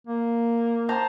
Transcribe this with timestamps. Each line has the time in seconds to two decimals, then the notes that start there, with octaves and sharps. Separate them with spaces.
0.07 A#3
0.89 C5 A5 A#5